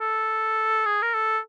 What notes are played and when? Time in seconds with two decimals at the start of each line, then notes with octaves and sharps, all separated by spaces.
0.01 A4
0.86 G#4
1.02 A#4
1.14 A4